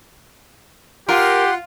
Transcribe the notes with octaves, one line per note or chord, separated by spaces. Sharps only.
F4 G4 A#4 F#5 C6